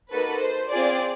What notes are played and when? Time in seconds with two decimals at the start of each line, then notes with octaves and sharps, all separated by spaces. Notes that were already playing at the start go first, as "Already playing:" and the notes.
0.11 A#3 D#4 F#4 A4 B4
0.41 C5
0.71 C4 F4 G#4 D5